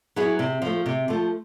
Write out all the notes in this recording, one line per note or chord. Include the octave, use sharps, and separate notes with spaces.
F#3 B3 E4 G#4
C3
F3 A3
C3
F3 A3